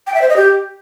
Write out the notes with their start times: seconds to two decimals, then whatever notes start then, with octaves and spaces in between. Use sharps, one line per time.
0.07 G5
0.14 E5
0.22 C5
0.29 D#5
0.37 G4